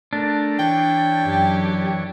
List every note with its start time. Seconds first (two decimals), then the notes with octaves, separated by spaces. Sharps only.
0.13 A3 D4 A#4
0.59 E3 C#5 G5
1.22 F#2 G4